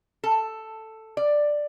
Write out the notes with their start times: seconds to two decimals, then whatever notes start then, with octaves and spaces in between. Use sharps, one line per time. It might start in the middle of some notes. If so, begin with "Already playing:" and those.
0.24 A4
1.17 D5